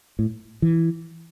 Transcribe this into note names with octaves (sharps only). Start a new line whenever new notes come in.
A2
E3